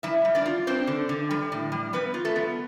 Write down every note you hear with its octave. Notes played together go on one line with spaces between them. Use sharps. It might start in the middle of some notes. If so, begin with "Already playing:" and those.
G3 E4 E5
G3
D4 D5
F4
C4 D4 C5
D3
D3
G3
A2
G3
G3 B3 B4
F4
A3 A4
B3